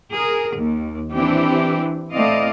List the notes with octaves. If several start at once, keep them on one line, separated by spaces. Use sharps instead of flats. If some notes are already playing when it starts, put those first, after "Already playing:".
G#4 A#4
D#2
E3 C4 D4 E4 G4
A3 C4 E4 D5 D#5 F5